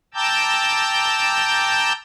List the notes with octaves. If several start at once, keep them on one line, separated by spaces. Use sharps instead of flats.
G5 A5 A#5 D6 E6 G6